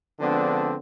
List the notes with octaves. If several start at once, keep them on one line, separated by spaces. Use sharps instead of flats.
D3 F3 G#3 B3 C4 D4